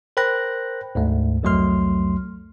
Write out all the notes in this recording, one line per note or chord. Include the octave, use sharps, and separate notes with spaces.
A#4 C5 G5 B5 F#6 A#6
D2 G#2 A3
C2 F2 F#3 A3 C6 F6